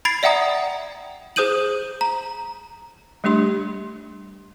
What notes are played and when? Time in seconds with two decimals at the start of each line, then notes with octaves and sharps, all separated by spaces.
0.05 B5 G#6 A6 C7 D7
0.23 D5 E5 F#5 G5 A#5 D#6
1.36 G#4 C5 D#6 G6 D#7 F#7
2.01 A#5
3.24 G3 A3 D4 G4 C6